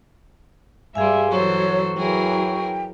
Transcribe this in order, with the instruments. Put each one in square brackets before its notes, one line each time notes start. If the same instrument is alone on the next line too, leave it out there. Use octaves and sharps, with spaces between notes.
[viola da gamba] G2 G3 [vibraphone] G#4 F5 G#5 [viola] E5 C6
[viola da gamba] E3 A4 C5 [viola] F#3 [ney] C#5 [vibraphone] C#6
[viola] E3 F#3 [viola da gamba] G#4 A#4 [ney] G5